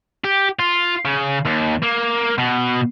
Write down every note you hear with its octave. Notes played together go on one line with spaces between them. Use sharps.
G4
F4
C#3
D#2
A#3
B2